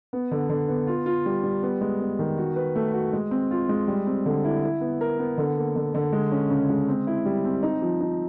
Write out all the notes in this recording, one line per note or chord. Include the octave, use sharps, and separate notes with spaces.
B3
D3
D3
B3
F4
F4
G3
G3
B3
G#3
B3
D#3
F#4
B4
A3
F#4
G#3
C4
F4
G#3
G3
C4
D3
E4
E4
B3
A#4
B3
D3
A#3
D3
D3
G#3
C#4
C#3
G#3
C4
E4
G3
C4
D#4
F3
D#4